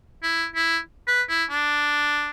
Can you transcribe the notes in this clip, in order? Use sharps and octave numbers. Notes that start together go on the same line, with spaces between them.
E4
E4
B4
E4
D4